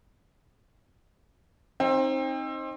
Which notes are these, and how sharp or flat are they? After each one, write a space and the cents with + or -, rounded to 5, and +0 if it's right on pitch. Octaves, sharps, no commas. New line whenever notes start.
C4 +25 D#4 +0